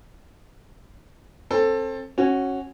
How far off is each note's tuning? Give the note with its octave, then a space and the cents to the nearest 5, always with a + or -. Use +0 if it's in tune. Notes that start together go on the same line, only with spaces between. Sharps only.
C4 +25 A4 +10
C#4 -20 F#4 +0